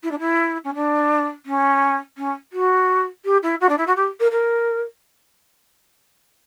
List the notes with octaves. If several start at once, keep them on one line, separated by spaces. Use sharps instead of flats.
E4
D4
E4
C#4
D4
C#4
C#4
F#4
G4
E4
F#4
D4
E4
F#4
G4
A#4
A#4